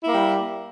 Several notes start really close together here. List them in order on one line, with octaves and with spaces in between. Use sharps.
E4 A#3 G3